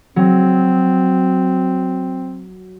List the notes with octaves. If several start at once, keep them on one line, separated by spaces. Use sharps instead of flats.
F#3 C4